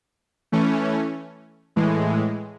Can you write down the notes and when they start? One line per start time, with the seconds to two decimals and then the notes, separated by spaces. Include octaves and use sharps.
0.52 E3 A3 C#4
1.76 A2 E3 G#3